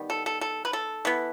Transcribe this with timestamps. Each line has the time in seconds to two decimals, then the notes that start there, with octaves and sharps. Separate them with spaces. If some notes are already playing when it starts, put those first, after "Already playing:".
Already playing: D#3 G3 B3
0.10 A4
0.26 A4
0.41 A4
0.65 B4
0.73 A4
1.05 E3 B3